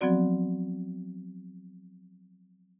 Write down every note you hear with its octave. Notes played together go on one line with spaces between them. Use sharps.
F3 F#3 B3 C4 F#4 D5